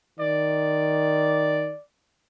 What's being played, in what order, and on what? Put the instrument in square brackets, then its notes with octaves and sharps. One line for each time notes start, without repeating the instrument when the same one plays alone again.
[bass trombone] D#3 [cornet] D5